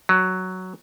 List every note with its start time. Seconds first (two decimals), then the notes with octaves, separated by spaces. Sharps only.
0.09 F#3